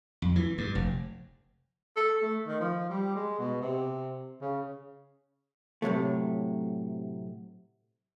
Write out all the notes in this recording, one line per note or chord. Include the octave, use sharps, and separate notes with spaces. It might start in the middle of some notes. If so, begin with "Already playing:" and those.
F2
E3
G2
F1
A4
A3
D#3
F3
G3
G#3
B2
C3
C#3
A2 C3 F#3 A3